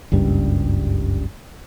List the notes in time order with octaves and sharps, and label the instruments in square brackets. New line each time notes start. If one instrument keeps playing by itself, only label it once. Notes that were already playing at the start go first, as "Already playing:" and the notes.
[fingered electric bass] F#1 C#2 G2 G3